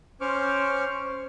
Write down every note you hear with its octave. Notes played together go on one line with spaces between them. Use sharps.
C#4 C5 C#6 D6 F6